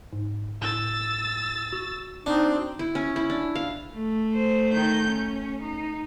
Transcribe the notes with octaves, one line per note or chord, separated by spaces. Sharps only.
G#2
A2 E6 A6
F#4
C4 D4 D#4
E4
C#4
E4
D4
F5
A3
C5
D#3 G6
C#4
D#4